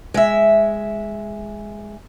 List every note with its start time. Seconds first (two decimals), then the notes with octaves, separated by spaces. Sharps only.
0.14 G#3 E5